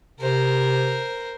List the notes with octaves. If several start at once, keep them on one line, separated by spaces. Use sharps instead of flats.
C3 A#4 C5